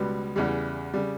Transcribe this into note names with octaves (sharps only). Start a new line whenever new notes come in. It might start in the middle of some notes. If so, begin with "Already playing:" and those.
Already playing: C#2 B2 G3 B3
E2 C#3 G3
C#3 G3